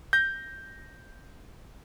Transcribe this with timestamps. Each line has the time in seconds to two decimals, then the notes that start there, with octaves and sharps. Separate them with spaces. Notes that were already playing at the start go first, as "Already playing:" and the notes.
0.13 G6 A#6